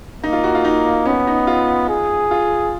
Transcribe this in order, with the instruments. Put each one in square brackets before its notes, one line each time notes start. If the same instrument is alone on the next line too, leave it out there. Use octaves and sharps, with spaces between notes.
[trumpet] A#3 [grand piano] D#4
[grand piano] F4
F#4
F4
D#4
[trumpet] B3 [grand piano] C#4
[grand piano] D#4
F4
[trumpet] G#4
[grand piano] F4